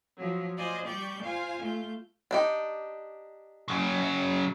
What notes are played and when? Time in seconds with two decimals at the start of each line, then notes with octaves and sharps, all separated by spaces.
0.17 F3 F#3
0.57 F4 C5 D5 D#5 G#5
0.87 G3 G4 D5 C#6 G6
1.22 F4 C5 F5 G#5
1.62 A3 F4 G6
2.31 D4 D#4 G4
3.68 C#3 F#3